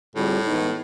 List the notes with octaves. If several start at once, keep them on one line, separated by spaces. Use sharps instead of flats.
A2 D3 G3 C4 F4 G#4
E3 G#3 B3 D#4